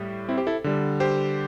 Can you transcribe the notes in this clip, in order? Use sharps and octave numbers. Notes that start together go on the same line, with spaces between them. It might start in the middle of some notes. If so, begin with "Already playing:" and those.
Already playing: A2 G3
C4 E4
G4 C5
E4 A4
D3 G3
G4 C5